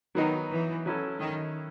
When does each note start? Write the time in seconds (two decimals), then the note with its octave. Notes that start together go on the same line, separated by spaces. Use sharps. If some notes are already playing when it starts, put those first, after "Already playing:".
0.15 D#3 F#3 B3 D#4
0.50 E3
0.86 F#3 C#4 E4 A4
1.20 D#3